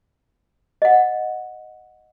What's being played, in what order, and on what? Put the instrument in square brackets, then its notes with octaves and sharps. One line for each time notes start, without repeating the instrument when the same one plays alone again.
[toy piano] D#5 F#5